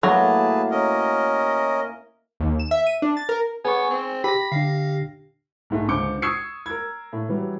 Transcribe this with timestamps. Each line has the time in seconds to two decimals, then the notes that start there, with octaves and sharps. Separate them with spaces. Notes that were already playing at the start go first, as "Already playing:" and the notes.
0.03 A2 F#3 A#3 G#4 B4 A5
0.71 C#4 A#4 D#5
2.40 D#2
2.59 E7
2.71 E5
2.87 D#7
3.02 D4
3.17 A6
3.29 A#4
3.65 B3 G#4 G#5 C#6
3.90 C4
4.24 G4 B5 A#6
4.52 D3 D4 F5
5.70 B1 G#2 A3
5.88 C#2 D3 C5 D6 G6 C#7
6.22 C#6 D#6 E6 G#6 C7 C#7
6.66 A#4 G#6
7.13 A2
7.29 E3 F#3 G3